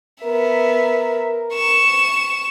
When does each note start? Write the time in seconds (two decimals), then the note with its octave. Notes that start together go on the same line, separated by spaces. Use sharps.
0.24 B3 A#4 E5
1.54 C#6 E7